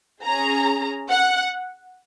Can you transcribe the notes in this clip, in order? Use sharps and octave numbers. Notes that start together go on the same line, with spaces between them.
C#4 G#4 A#5
F#5